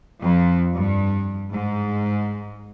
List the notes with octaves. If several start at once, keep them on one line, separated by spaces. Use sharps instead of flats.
F2
G2
G#2